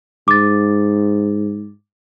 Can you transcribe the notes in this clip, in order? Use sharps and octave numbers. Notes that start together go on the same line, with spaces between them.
G#2 D6 A6